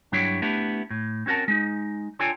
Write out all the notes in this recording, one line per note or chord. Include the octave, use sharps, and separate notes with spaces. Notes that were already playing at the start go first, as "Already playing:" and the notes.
G2 F#3 D4 E4 G4 C#5
A3 B3 D4 E4 G4
A2
C4 C#4 F#4 A#4 A5
G#3 D#4
D4 F4 A4 C#5 G5 G#5